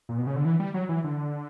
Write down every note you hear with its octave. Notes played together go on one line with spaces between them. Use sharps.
A#2
B2
C#3
D3
E3
G3
F#3
E3
D3